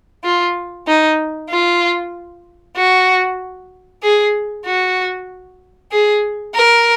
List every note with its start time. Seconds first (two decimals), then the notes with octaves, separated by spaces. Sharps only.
0.24 F4
0.87 D#4
1.50 F4
2.77 F#4
4.03 G#4
4.65 F#4
5.92 G#4
6.55 A#4